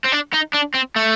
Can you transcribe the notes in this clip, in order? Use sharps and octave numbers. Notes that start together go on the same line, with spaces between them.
C4
D4
D#4
D4
C4
A3